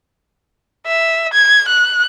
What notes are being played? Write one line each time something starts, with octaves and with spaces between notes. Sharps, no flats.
E5
G#6
F#6